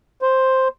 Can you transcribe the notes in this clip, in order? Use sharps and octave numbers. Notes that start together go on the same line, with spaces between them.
C5